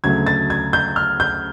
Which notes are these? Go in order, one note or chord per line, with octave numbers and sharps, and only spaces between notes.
D2 C#3 F#3 A3 G#6
A6
G#6
G6
F6
G6